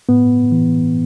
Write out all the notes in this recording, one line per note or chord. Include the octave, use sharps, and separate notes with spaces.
A2 B3
E3